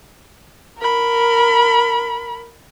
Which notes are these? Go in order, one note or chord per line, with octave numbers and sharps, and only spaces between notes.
A#4 B5